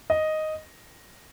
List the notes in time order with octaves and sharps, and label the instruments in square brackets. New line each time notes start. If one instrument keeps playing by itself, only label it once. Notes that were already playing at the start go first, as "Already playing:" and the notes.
[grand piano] D#5